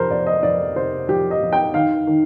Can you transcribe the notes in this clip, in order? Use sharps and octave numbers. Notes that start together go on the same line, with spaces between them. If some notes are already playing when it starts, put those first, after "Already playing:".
Already playing: F2 C3 F3 A#4 C5
F2 D5
D#5
F2 D5
C3 C5
F3 G4
D#5
F2
G5
D#3 F5
D#3